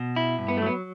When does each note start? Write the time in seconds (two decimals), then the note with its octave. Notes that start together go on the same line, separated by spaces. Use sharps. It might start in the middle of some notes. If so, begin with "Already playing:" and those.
Already playing: B2
0.16 E4
0.39 G2
0.48 B3
0.57 A3
0.62 F#3 B3